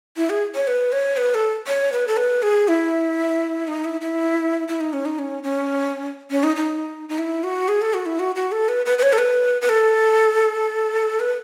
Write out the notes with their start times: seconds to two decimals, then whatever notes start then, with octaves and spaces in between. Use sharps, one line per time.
0.17 E4
0.30 G#4
0.55 C#5
0.67 B4
0.92 C#5
1.17 B4
1.35 A4
1.67 C#5
1.92 B4
2.07 A4
2.17 B4
2.42 G#4
2.68 E4
3.68 D#4
3.84 E4
4.01 E4
4.68 E4
4.81 D#4
4.93 C#4
5.05 D#4
5.19 C#4
5.43 C#4
6.31 C#4
6.43 D#4
6.56 D#4
7.09 D#4
7.18 E4
7.44 F#4
7.68 G#4
7.82 A4
7.94 F#4
8.06 E4
8.19 F#4
8.36 F#4
8.52 A4
8.69 B4
8.86 B4
8.98 B4
9.03 C#5
9.13 A4
9.18 B4
9.62 B4
9.69 A4
11.20 B4